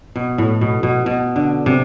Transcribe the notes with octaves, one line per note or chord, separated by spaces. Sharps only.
B2
A2
B2
B2
B2
D3
C3